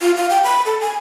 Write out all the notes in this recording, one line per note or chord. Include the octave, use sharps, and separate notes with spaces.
F4
F5
G5
B5
A4
G#5